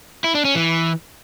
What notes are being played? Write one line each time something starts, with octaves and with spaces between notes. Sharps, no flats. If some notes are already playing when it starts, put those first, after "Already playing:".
E4
D4
C#4
E3